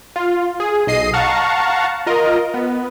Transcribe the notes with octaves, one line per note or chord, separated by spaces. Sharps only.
F4
G#4
B1 D#5 C7 D#7
F5 F#5 A5 A#5 C#6
F4 A#4 D#5
B3